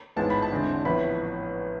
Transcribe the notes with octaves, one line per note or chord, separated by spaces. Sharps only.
A1 G#2 G#3 B3 F4 A5
B5
A5
E2 D3 G#3 C4 E4
A1 A2 F3 B3 B5